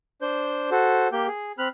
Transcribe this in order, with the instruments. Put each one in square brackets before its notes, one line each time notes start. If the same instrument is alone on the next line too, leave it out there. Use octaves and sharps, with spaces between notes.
[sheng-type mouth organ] D4 C5 G6
F#4 A4 C5
A#3 G4 G5
G#4
C4 B5 F6 F#6